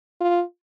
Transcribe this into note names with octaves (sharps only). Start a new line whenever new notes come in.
F4